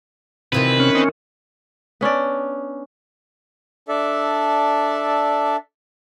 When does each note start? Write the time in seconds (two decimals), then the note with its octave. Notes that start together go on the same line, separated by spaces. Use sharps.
0.53 C3 D#3 E3 F4 B4
0.80 C#4
0.95 C4 D#4
2.01 B3 C#4 D4 D5
3.88 D4 A4 D5 E5